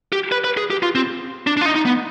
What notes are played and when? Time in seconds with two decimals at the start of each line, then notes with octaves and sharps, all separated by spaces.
0.13 G4
0.32 B4
0.44 B4
0.57 G#4
0.71 G4
0.83 F4
0.95 C4
1.47 D4
1.57 D4
1.61 F4
1.66 D#4
1.76 D#4
1.85 B3